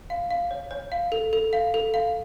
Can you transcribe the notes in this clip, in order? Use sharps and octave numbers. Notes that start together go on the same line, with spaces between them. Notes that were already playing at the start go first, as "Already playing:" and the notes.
F5
F5
C#5
C#5
F5
A4
A4
F5
A4
F5